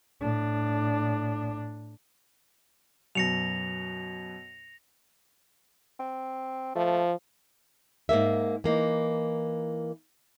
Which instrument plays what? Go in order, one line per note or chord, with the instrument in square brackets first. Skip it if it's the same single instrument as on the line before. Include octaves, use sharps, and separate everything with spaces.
[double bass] A2 D4
[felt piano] F#2 B2 [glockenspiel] A#6 C#7 F7
[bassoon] C4
[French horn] F3 [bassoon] A3
[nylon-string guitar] G#2 C#3 A#3 E5
E3 A#3 D#4